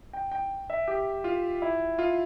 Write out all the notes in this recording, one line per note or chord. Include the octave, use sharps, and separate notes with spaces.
G5
G5
E5
G4
F4
E4
F4